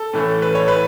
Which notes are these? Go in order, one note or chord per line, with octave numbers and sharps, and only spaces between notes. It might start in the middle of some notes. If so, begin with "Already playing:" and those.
Already playing: A4
A2 E3 A3 C#4
B4
C#5
B4